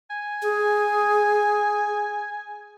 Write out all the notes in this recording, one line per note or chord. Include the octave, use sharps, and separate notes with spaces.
G#5
G#4